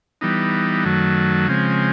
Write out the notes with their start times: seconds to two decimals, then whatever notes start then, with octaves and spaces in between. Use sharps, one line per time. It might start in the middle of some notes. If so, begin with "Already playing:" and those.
0.21 E3 G3 B3 D#4
0.85 F#2 D#3 F#3 A3
1.48 C#3 F3 G#3 C4